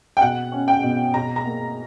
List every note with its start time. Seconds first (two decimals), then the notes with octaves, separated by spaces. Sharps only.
0.17 G5
0.21 B2 F#5
0.52 C#4
0.68 G5
0.83 B2
1.14 B2 A#5
1.36 A#5
1.45 A#3